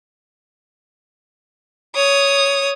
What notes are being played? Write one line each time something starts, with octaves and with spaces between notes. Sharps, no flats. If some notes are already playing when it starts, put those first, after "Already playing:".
C#5 D#6